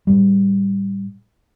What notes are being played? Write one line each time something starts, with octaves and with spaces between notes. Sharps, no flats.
A2 G3